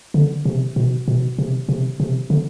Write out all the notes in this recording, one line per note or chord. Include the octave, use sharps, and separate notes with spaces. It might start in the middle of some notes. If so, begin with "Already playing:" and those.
D3
C3
B2
B2
C3
C3
C3
D3